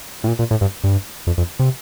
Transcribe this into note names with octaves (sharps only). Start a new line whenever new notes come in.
A2
A#2
A#2
A2
G2
G2
F2
F2
C3